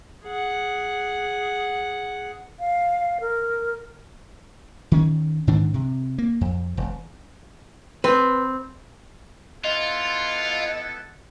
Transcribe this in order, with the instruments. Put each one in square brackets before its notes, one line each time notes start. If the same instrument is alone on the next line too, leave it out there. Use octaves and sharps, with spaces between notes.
[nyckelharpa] G#4 F#5
[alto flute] F5
A#4
[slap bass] D#3 C#4
G#2 D#3 E3 D4
C3
A#3
F2
E1
[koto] C4 [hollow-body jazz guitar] B4
[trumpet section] B3 E4 A4 [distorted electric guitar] F4 [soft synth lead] D#5